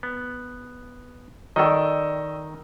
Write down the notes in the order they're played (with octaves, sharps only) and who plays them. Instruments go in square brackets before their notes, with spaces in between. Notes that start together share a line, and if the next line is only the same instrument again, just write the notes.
[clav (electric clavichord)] B3
[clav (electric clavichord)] D#3 [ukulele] A4 D5 G5 [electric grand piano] D#5 C#6 E6